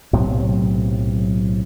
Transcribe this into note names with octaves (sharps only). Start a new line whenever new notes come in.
B1 A2 C3 F#3